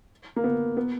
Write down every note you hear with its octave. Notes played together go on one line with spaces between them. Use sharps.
A#3
B3
B3